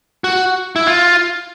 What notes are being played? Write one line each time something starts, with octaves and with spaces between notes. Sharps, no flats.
F#4
E4
F4